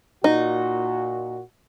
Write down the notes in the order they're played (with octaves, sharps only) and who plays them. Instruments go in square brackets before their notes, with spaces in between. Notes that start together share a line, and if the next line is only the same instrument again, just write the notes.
[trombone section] A#2 F#4 [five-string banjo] D#4